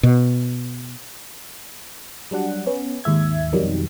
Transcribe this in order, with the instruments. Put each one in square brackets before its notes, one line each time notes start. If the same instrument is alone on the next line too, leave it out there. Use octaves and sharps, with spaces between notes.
[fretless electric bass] B2
[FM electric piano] F#3 G3 D4 F#5
B3 C#4
D#2 G#2 E5 G#6
F2 B2 D#3 F#3 G3